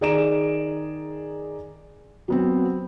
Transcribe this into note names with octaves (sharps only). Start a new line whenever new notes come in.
D#3 G#4 D5 A#5 D7 E7
F#3 B3 C4